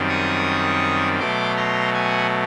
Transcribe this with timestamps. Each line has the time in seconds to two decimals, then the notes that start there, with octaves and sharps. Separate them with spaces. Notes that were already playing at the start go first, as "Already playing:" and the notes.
Already playing: F#2 D#3 G3 C4
0.09 C#6 D#6
1.20 B2 F#3 A3 C6 D6
1.57 A#5 C6
1.94 F#5 G#5